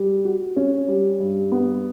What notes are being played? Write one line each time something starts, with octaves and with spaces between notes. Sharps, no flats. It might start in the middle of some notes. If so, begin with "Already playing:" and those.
Already playing: G3
F#4
C#4
G3
G2
B3